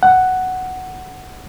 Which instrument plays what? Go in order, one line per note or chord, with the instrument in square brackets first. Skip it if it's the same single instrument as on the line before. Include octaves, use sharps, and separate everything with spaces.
[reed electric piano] F#5